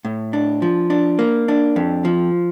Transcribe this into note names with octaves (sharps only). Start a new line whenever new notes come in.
A2
D4
F3
D4
A#3
D4
F2
F3